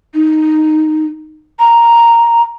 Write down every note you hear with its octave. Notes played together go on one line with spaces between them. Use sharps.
D#4
A#5